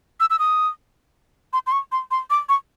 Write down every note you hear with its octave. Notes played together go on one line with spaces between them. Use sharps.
E6
E6
D#6
C6
C6
C#6
C6
C6
D6
C#6